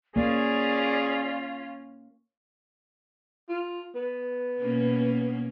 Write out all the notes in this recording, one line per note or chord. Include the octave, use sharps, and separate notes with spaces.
A#3 C#4 F4 G#4 D5
F4
B3
B2 A#3 C#4